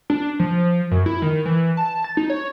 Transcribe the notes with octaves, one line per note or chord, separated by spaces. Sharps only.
D4
F3
F#2
E4
D#3
E3
A5
A6
D#4
C#5